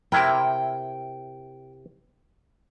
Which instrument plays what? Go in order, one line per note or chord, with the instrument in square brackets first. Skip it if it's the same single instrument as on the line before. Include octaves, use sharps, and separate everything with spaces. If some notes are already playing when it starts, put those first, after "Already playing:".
[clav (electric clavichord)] C3 E4 A#4 [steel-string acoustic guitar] G5